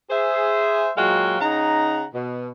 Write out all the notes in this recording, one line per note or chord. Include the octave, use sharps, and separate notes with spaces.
G#4 C5 E5
A#2 F#3 G#3 F#4 F5 G5
C#3 D#4 F#5 A#5
B2